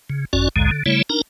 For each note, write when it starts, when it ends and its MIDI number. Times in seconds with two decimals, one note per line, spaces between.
0.10 0.25 49
0.33 0.49 32
0.33 0.49 42
0.33 0.49 61
0.33 0.49 66
0.33 0.49 74
0.56 0.71 34
0.56 0.71 39
0.56 0.71 44
0.56 0.71 50
0.56 0.71 56
0.71 0.83 50
0.86 1.02 49
0.86 1.02 55
0.86 1.02 57
0.86 1.02 64
0.86 1.02 73
1.10 1.21 62
1.10 1.21 63
1.10 1.21 70
1.10 1.21 82